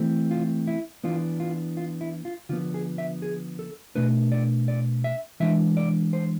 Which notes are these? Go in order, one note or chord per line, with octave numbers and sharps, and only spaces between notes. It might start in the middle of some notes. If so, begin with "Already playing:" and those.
Already playing: E3 A3 C4
F4
E4
E3 B3 D4 F4
F4
F4
E4
F4
D3 F3 B3 F4
G#4
E5
G#4
A4
B2 A3 D4 B4
D5
D5
E5
E3 G#3 D4 E5
D5
C5